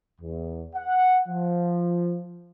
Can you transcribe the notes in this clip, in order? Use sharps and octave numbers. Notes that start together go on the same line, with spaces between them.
E2
F#5
F3